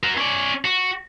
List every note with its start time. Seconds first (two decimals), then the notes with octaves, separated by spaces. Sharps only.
0.03 F#4 A#4
0.17 C#4 D5
0.65 F#4